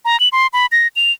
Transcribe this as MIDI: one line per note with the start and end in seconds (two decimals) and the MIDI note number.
0.05 0.19 82
0.20 0.29 102
0.32 0.47 84
0.53 0.66 83
0.72 0.88 94
0.96 1.12 101